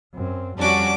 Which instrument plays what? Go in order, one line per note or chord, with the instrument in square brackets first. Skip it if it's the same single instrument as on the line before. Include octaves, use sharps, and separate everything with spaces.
[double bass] F#2 C4
[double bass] F2 G3 [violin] C#4 D6 [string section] D4 F#4